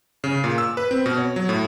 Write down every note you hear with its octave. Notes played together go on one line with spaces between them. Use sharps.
C#3
A#2
E6
B4
C4
B2
C#5
F#3
A2